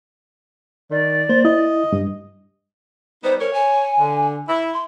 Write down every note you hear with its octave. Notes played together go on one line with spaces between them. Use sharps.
D#3 D5
A#3 C5
E4 D#5
G2
G3 B3 D#4 C5
A#4 C#5
G#5
D3
E4
C6